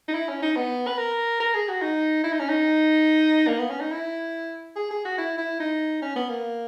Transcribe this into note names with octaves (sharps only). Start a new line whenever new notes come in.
D#4
E4
C#4
D#4
B3
B4
A#4
A#4
G#4
F#4
D#4
E4
D#4
C#4
D#4
A#3
B3
C#4
D#4
E4
G#4
G#4
F#4
E4
E4
D#4
C#4
B3
A#3